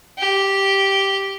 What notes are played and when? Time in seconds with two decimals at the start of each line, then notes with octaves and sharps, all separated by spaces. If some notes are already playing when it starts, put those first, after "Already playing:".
0.19 G4